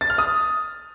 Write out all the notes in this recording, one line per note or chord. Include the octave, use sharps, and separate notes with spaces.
A6
F6
D#6